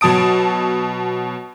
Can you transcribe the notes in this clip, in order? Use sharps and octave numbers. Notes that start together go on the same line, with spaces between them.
B2 F#3 A5 D#6 D7